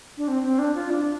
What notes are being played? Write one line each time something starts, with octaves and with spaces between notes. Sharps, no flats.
D4
C4
C4
D4
F4
D4